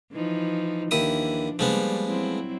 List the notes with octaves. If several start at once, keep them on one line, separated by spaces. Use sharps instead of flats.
E3 F3 D#4
D#2 E3 F3 D4 E4 D#6
F3 G3 G#3 A#3 B3
F#3 C4 E4